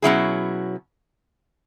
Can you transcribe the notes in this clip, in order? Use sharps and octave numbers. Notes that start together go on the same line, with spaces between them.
B2 F#3 C#4 E4 G#4